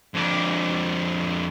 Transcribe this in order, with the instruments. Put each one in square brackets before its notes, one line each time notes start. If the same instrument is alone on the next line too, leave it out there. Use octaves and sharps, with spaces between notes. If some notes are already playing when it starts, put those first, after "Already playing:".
[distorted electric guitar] F2 D4